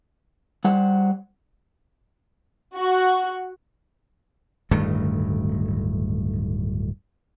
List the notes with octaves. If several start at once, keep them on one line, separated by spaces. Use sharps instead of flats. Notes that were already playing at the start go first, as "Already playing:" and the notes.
G3 C5 F#5
F#4
D1 G2 D#3 A3